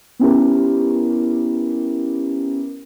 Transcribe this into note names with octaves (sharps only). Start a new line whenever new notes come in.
B3 C#4 E4 G4 A#4